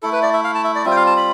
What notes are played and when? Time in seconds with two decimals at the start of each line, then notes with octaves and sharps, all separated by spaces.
0.02 A3 E4 A4
0.12 B4
0.23 D5
0.33 E5
0.44 F5
0.55 A5
0.64 E5
0.75 D5
0.85 G3 C4 F4 E5
0.91 G5
0.96 F5
1.07 A5
1.17 B5